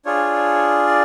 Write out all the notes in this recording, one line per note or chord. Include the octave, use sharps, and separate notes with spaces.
D4 F4 G#4 C#5
D5